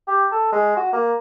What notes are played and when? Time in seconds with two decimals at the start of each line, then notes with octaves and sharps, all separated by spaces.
0.07 G4
0.32 A4
0.52 G#3
0.77 F#4
0.93 A#3